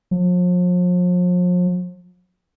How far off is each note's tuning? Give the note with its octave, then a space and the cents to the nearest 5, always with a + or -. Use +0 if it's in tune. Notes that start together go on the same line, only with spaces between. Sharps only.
F3 +40